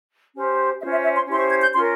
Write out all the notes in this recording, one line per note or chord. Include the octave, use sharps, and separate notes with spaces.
C#4 G4 C5
C#4 F4 C5 E5
E5
E5
C6
C#4 E4 G4 C5 C6
C#6
G#6
G6
C#4 F4 A#4 C6